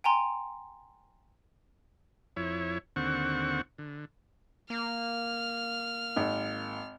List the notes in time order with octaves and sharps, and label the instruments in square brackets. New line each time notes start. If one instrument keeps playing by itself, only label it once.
[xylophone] G5 G#5 A#5 C6
[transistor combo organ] F2 E4 C#5
D#2 D3 C4 F#5 C#6
D3
[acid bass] A#3 [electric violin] F6
[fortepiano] G#1